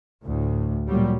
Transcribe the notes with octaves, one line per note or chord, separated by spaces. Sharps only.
D2 A2
A#2 F#3 G3